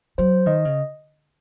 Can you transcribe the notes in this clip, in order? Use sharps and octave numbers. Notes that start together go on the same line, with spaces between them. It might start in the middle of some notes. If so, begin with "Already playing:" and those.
F#3 C5
D#3 D#5
C#3